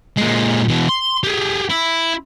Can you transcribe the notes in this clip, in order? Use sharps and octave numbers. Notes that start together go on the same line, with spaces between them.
A#2 G#3
B2 E3
C6
G4 G#4
E4